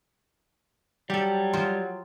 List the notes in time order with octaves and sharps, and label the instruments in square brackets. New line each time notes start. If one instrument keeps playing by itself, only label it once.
[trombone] F#3 [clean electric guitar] G3 [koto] G4 A4
[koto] F3 F4 C5